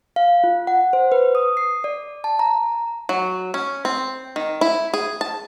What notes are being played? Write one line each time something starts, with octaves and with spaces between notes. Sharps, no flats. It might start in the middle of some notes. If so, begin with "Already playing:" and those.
F5
F4
F#5
C5
B4
D#6
C7
D5
A5
A#5
F#3
C#4
C4
D#3
E4
G#4
A5